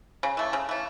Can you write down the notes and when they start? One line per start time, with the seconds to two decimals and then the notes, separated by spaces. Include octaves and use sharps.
0.23 C#3
0.37 E3 A3
0.53 C#3
0.69 E3 A3